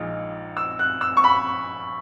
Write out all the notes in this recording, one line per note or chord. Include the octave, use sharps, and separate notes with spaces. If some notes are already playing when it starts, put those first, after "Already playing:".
Already playing: A#1 A#2 G#3 D#4
E6
F#6
E6
C#6
B5